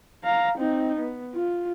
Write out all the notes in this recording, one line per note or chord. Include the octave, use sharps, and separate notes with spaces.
F5 A#5
C4 D#4
B3
F4